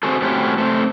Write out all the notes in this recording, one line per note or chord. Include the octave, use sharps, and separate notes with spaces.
C4 F#4 G#4 A4
A3 C4 C#4 E4 F#4 G4
A3 C4